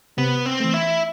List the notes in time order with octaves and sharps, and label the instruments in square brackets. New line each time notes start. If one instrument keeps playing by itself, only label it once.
[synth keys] C3 [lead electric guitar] B3
[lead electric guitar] C4
[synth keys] E3 A3
[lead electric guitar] E4